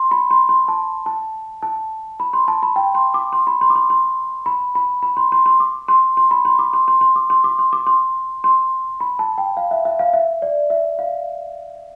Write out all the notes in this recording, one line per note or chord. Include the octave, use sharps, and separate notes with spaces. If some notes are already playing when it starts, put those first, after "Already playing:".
Already playing: C6
B5
C6
C6
A5
A5
A5
B5
C6
A5
B5
G5
C6
D6
C6
B5
C6
D6
C6
C6
B5
B5
B5
C6
C6
C6
D6
C6
C6
B5
C6
D6
C6
C6
C6
D6
C6
D6
C6
D6
C6
C6
B5
A5
G5
F5
E5
E5
F5
E5
D5
E5
F5